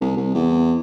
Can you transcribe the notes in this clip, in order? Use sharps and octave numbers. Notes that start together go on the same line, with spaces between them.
C2
C2
E2